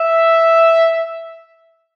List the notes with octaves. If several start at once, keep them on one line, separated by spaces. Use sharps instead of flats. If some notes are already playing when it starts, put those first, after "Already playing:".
Already playing: E5